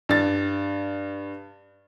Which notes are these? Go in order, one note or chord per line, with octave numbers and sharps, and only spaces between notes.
G2 A6